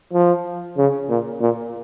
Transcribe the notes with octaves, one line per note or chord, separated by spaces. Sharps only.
F3
C#3
A#2
A#2